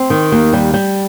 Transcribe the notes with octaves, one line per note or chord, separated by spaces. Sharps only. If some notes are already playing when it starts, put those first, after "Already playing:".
Already playing: C4
D#3
D#2
G3
G3